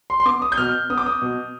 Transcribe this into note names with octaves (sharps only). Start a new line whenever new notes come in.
C6
C6
B3 D6
D#6
G6
B2 F6
B3 D#6
D6
D#6
B2